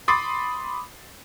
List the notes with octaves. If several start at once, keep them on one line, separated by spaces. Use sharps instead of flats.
B5 C6 D6 D#6 A6 C7